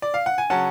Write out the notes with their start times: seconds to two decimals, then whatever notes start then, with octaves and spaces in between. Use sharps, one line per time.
0.02 D5
0.14 F5
0.26 F#5
0.38 G#5
0.50 C#3 F#3 C#4 F#5 A5